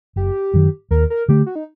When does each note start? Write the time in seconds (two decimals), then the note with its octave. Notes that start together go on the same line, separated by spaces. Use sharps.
0.16 F#1 G4
0.54 F#2 D#3
0.91 D#2 A#4
1.10 A#4
1.28 D3 A3 G4
1.46 F#4
1.55 D#4